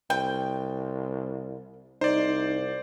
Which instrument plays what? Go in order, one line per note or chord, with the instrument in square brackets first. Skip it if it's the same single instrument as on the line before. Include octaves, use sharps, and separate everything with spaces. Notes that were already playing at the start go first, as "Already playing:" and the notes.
[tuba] C2 [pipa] G5
[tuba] C2 [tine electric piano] D#4 [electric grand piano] C5 D5